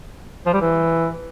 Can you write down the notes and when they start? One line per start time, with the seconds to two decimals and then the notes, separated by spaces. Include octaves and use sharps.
0.46 F3
0.53 G3
0.61 E3